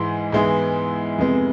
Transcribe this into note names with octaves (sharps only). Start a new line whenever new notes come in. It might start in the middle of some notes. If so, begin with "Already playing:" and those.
Already playing: G#2 E3 G#3
G#2 E3 G#3 B3 E4
F2 C3 G#3 B3